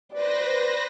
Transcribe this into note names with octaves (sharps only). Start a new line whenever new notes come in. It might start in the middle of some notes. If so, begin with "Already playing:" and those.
B4 C5 D5 A#6